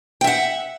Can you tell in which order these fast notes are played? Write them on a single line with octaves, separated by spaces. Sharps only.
G5 E5 F#5